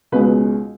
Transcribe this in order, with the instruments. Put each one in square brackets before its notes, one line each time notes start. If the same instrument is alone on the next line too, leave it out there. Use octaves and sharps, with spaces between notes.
[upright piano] C#2 B2 G#3 B4